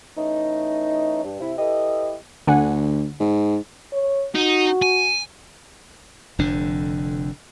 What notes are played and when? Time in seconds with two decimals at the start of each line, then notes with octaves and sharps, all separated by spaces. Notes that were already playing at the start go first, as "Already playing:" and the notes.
0.17 E3 A3 C#4 D#4
1.24 G2
1.40 C3 E4
1.58 E4 G4 A4 B4 D#5
2.47 D2 D3 F#5 G#5
3.20 G#2
3.93 C#5
4.35 D#4 F#4
4.82 G#5
6.39 F1 F2 D3 D4